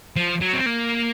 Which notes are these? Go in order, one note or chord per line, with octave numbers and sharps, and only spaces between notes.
F3
F#3
C4
A#3